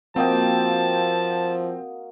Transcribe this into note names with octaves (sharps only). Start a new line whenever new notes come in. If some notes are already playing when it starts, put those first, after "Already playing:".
F3 A#3 C4 F#4 D#5 G5 A5